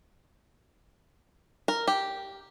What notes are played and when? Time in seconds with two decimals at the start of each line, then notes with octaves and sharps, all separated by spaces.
1.68 A#4
1.87 G4